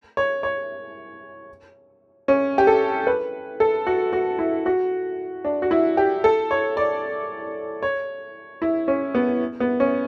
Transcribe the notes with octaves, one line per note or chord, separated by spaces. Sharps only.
C#5
C#5
C#4
G4
A4
B4
A4
F#4
F#4
E4
F#4
D4
F#4
E4
G4
A4
C#5
D5
C#5
E4
C#4
B3
B3
C#4